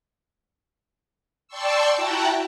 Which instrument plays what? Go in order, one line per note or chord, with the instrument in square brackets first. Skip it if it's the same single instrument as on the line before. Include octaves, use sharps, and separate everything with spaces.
[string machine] D5 G5 A5 C6 C#6 E6
E4 F#4 F#5 G5 A5 A#5